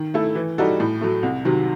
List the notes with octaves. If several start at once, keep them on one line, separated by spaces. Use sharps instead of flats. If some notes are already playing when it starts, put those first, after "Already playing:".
Already playing: D#3
A3 E4 A4
E3
G3 D#4 F#4 A4
A2
F#3 A3
C2
C3 D#3 F#3